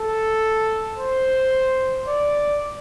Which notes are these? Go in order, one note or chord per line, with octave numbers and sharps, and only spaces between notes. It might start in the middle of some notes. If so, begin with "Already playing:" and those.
Already playing: A4
C5
D5